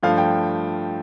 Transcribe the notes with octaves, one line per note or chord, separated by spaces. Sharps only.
G2 F3 A3 F5
G5